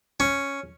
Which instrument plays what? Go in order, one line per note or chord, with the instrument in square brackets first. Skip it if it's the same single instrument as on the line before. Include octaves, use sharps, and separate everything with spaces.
[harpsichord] C#4